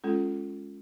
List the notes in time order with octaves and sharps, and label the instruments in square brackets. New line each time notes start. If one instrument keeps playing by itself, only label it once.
[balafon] G#3 C#4 F4 A4